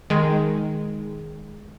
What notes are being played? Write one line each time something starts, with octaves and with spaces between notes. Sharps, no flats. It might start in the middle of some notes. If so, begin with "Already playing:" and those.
D#3 G#3